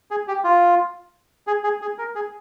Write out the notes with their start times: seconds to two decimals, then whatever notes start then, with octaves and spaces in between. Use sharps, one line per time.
0.11 G#4
0.28 G4
0.44 F4
1.47 G#4
1.64 G#4
1.82 G#4
1.98 A#4
2.15 G#4